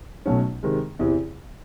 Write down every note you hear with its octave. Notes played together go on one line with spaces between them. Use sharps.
B1 B2 F#3 A3 C#4
C3 D#3 G#3
E2 C3 E3